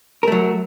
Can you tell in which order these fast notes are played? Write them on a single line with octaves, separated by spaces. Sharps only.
A#4 A3 F#3